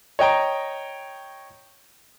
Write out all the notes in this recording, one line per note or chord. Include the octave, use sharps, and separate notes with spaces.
C#5 D#5 G5 A#5